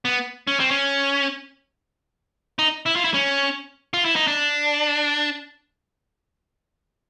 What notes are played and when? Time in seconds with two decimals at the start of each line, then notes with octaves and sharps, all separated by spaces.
0.05 B3
0.47 C#4
0.60 C4
0.71 C#4
2.59 D#4
2.86 E4
2.96 F4
3.05 E4
3.14 C#4
3.94 F4
4.05 E4
4.16 D#4
4.27 D4